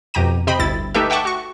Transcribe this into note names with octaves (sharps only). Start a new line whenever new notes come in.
F2 B2 G4 A#5 D#7
C3 C5 D#5 G5 B5
G1 D2 E4 A6
A3 D#4 G4 A4 B4 E5
E5 F#5 G5 A5 C#6 D6
F#4 C#6